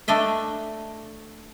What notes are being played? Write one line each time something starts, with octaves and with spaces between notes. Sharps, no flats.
A3 D4 D#5 E5